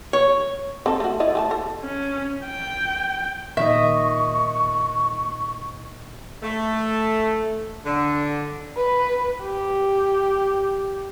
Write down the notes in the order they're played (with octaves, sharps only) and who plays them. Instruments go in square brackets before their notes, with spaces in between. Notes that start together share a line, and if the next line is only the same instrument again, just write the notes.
[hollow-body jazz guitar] C#5
[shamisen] C4 D#4 A4
A3 F#4
E4 D5 D#5
A3 G#5 A5
A4
[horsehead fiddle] C#4
G5
[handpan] A#2 D#3 D#5 [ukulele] E5 [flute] C#6
[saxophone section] A3
D3
[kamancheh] B4
G4